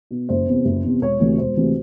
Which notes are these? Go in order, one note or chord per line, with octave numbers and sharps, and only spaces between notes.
B2
F#1 C5
E2 C3
F#1
E2 C3
E1 C#5
D2 C3 E3
E1 C5
D2 C3 E3